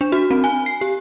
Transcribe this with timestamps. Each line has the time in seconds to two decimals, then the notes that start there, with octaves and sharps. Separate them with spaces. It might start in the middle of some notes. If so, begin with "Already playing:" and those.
0.01 D4
0.12 F#4
0.31 C4
0.44 G#5
0.66 C7
0.81 G4